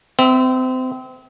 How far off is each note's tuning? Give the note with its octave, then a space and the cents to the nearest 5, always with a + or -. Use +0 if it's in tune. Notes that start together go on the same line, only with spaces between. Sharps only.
C4 -30 E5 +0